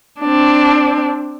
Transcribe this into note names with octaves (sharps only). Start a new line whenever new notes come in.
C4 D4